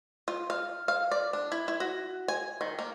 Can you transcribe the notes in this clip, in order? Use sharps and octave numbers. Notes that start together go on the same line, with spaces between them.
F4
F5
F5
D5
D4
E4
E4
F#4
G#5
D#3
A#3